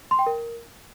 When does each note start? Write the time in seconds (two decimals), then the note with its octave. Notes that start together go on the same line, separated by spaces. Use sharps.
0.11 C6
0.19 G5
0.26 A#4